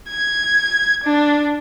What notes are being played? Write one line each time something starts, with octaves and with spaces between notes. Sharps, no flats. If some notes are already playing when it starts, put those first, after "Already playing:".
G#6
D4